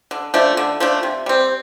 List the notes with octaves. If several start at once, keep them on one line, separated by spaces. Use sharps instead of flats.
D3
F3 A3 D4
D3
F3 A3 D4
C3
G3 C4